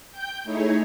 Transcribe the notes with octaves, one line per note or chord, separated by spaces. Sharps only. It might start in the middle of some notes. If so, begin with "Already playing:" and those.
G5 G6
A3 D#4 E4 G#4 C#5